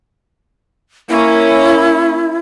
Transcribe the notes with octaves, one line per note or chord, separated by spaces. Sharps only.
A#3 C#4 E4